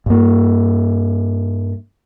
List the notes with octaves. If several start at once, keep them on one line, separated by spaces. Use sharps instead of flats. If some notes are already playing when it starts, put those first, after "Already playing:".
G2 A#3